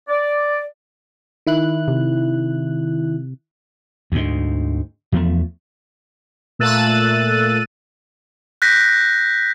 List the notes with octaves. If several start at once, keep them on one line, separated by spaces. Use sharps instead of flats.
D5
D#3 E4 F#6
C3
D2 G#2
E2 F3 G3 A3
A#2 A3 E6 F#6 A6 D#7
F#6 G6 A#6 B6